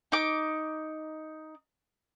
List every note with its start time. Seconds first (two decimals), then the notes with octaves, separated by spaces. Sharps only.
0.12 D#4 D6